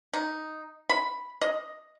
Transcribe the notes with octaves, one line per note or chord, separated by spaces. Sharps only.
D#4
B5
D#5